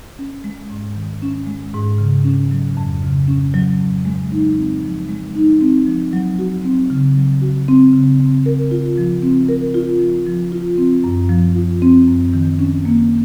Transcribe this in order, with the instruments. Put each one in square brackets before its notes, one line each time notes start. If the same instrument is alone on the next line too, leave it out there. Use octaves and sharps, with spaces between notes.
[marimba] C#4
G#3
G#2
D#3
C#4
G#3
G#2
C#3
C#4
F#3
F2
C#3
C#4
F#3
F2
G#3
D#4
C4
F3
G#3
D#4
C4
F3
F#3
F#4
C4
C#3
F#3
F#4
C4
C#3
C4
A#4
F4
F3
C4
A#4
F4
F3
F3
F4
C4
F#2
F3
F4
C4
F#2
D#3
C#4
A#3